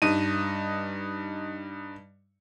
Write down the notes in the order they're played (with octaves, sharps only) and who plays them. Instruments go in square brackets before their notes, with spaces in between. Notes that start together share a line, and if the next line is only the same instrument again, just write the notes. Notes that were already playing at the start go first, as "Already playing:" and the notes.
[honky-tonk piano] G2 D#4 D#7